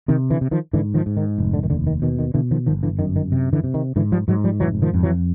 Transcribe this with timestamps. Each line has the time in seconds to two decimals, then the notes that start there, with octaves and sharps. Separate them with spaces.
0.08 C3 D#3
0.30 D3 E3
0.41 C3
0.51 D#3 F3
0.73 G#2 D3 E3
0.94 D#3 F3
1.06 G#2
1.17 D#3
1.38 F1
1.54 D3
1.63 D#3
1.70 D#2 D3
1.87 D#3
2.02 B2 D#3
2.19 D#3
2.34 B2 D3 E3
2.51 D#3 F3
2.66 G1 D#3 F3
2.83 D3 E3
2.99 F#2 D#3
3.16 D#3
3.32 C3
3.53 D3 E3
3.64 C3
3.74 D#3
3.96 G#2 D3 E3
4.12 F3 G3
4.28 G#2 F#3 G#3
4.44 F3 G3
4.60 F1 E3 F#3
4.82 D#3 F3
4.94 F2
5.03 E3 F#3